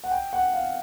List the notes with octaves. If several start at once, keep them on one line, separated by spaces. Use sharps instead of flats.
F#5
G5
F#5
F5